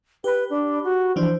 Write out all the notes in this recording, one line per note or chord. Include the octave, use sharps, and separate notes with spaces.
G4 B4 B5
D4
F#4
E3 F3 D4 C5